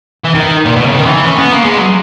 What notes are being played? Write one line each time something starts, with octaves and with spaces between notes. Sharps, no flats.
E3
D#3
A#2
B2
C#3
D#3
E3
C#4
B3
A#3
G#3
F#3